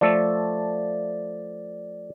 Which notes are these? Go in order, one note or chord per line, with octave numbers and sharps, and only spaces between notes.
F3 A3 A4 D5